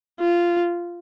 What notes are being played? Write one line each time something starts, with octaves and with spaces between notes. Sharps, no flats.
F4